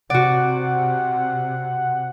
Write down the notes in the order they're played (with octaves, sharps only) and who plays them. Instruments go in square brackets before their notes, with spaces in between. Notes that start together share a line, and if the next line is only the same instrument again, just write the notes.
[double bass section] C3 [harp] F#4 D5 [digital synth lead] F#5